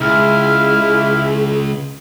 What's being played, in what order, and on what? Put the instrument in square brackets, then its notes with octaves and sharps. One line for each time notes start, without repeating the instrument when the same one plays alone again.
[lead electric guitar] C#2 [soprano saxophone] E4 [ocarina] G#4 [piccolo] F6